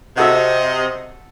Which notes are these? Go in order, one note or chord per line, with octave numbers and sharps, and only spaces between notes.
C3 F#4 A4 D#5 E5